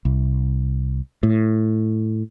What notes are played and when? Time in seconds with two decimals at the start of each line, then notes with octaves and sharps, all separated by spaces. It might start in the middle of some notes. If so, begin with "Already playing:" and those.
0.05 C2
1.23 A2